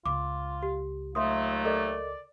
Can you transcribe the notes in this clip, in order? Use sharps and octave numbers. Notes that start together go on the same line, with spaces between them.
C#2 F4 D6
G4
D#2 F#3 A3 F4 E5 C6 D#6
A4 A#4 D5 D#5